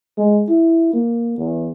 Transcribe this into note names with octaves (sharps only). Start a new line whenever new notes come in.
G#3
E4
A#3
E2